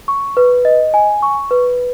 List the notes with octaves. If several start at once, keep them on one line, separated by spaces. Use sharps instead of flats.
C#6
B4
D#5
G#5
C#6
B4